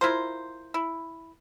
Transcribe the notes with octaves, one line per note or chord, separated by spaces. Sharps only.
E4 F4 A#4 C5
E4